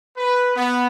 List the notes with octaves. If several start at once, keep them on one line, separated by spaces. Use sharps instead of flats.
B4
B3